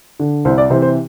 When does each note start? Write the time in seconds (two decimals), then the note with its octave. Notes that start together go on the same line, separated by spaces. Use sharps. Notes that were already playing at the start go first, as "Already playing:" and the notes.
0.20 D3
0.45 C2 C5
0.58 D5
0.70 C3 E3 C5
0.82 C5